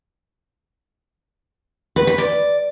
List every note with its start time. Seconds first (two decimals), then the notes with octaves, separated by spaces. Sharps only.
1.96 B4
2.07 B4
2.18 D5